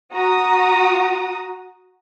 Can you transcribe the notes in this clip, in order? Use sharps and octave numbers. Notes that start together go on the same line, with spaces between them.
F#4 A#5 D#6